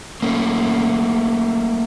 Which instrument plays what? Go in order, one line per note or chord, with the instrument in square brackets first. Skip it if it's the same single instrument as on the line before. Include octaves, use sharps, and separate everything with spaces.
[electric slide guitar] A3 A#3 C#4